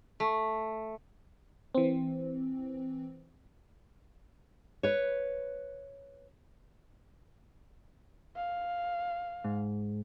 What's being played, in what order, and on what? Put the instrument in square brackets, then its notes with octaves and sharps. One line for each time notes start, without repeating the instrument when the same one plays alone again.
[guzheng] A3
[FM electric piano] E3 C4
[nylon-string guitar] B4 C#5
[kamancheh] F5
[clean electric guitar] G#2